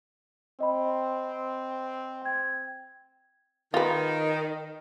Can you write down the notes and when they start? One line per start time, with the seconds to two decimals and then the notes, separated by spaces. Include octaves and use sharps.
0.60 C4 D#5 B5
2.22 G5 G#6
3.74 D#3 F4 B4